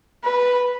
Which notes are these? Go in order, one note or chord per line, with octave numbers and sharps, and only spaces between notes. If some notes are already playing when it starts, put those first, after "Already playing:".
B4